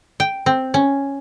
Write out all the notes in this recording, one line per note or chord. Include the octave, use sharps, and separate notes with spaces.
G5
C4
C#4